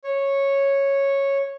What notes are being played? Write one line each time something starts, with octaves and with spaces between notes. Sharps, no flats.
C#5